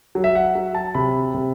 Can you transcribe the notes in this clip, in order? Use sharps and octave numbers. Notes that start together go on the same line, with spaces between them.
F#3
E5
F#5
F#3
A5
C3 B5
C3